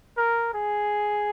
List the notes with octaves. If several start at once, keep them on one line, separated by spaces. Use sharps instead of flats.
A#4
G#4